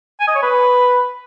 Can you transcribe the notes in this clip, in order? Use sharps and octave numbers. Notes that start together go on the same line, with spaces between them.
G#5
D#5
C#5
B4